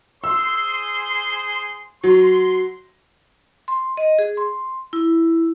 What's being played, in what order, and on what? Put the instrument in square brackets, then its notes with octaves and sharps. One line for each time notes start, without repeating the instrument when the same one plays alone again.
[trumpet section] G#4 C5 C6 [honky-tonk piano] E6
[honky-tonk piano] F#3 [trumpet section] C6
[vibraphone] C6
D#5
G#4
C6
E4